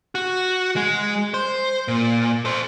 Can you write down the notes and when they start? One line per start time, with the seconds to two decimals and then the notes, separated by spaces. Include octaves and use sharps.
0.15 F#4
0.76 G#3
1.34 C5
1.88 A#2
2.45 A4 C5